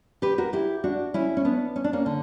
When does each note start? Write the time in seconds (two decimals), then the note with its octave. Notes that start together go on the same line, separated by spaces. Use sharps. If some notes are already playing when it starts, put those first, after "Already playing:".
0.22 G4 B4
0.38 F#4 A#4
0.53 E4 G4
0.84 D4 F#4
1.14 C#4 E4
1.37 C#4
1.45 B3 D4
1.76 C#4
1.84 D4
1.93 A#3 C#4
2.06 D3